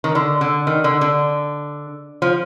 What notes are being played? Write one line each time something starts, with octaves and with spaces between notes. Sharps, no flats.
D#3
D3
D3
D#3
D3
D3
F3